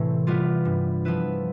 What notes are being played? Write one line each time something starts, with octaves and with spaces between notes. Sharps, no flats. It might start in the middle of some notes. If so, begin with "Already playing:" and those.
Already playing: A2 C3 E3 A3 C4
G3 B3 F4
G2
F3 B3 E4 B4